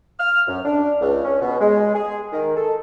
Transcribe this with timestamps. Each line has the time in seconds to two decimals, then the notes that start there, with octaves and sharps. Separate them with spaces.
0.19 F6
0.48 F#2
0.64 D4
1.00 C#2
1.25 C#4
1.42 B2
1.60 G#3
1.94 G#4
2.33 D#3
2.56 A4